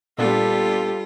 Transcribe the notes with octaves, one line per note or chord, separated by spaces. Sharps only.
A#2 G3 B3 D4 F4 G4 A4